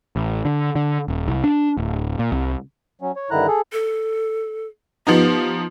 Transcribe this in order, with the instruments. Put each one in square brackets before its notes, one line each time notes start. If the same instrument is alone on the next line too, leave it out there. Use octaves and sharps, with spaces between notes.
[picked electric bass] A1
D3
D3
D#1
C2
D4
D1
A#2
C2
[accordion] F#3 C#4
C#5
G2 D3 D#3 E4 A#5 F#6
G#4 A4
[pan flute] A4
[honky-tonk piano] F3 B3 D#4 [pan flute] G4